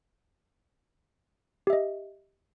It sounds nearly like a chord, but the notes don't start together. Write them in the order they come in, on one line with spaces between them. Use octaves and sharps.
G4 E5 D#5